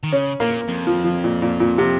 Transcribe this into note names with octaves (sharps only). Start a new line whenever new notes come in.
D#3
C#3 C#4
A#2 A#3
F2
F3
F3
A#2
A#2
A#2
C3